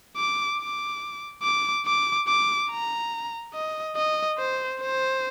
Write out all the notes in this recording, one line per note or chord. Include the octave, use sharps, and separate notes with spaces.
D6
D6
D6
D6
D6
A#5
D#5
D#5
C5
C5